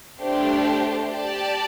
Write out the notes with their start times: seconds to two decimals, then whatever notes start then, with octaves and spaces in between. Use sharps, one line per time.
0.19 A3 D4 G4 C5
1.12 G4 D5 A5